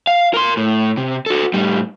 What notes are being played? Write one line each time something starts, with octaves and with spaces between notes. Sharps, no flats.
F5
A#4 C6
A2
C3
F#4 A4
A2 G3